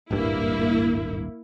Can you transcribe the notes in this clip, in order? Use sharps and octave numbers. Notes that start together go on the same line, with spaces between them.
D#1 G#1 G2 A#3 E4